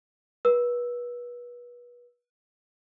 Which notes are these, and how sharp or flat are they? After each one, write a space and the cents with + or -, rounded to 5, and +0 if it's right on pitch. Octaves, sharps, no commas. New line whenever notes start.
B4 -30 E6 +0